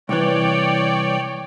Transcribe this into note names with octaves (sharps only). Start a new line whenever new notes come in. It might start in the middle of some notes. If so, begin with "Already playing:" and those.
C2 E3 C#5 D5 G5